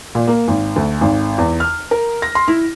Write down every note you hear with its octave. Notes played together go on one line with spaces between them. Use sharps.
A#2
A#3
G#1
D2
G#1
E2
F6
A#4
A#6
C6
E4